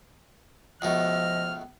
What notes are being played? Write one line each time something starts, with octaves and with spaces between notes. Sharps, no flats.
C#2 B2 F3 A3 D#5 F6